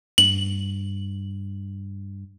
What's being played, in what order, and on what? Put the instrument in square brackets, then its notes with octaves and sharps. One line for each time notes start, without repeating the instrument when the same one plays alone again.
[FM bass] G2 [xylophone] F#7